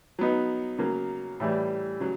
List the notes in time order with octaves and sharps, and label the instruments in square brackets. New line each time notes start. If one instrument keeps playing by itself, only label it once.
[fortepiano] F#3 B3 D#4
C#3 F#3 A#3
A2 E3 G3
C#3 F#3